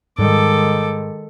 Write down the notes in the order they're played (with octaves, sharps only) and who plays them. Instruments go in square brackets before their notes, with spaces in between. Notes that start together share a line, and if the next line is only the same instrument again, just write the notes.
[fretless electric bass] G#2 G3 [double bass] D#3 G#3 [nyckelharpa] A4 D6